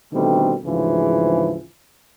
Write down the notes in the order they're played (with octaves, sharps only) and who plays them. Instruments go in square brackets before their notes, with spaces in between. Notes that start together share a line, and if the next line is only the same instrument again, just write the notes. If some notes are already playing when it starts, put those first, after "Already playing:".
[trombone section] B2 D3 D#3 G3 A3 C4
D2 G#2 C#3 E3 F3